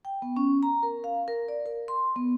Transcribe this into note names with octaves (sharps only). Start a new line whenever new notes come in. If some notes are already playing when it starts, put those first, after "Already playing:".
G5
B3
C#4
A#5
A#4
F5
A#4
D5
A#4
C6
B3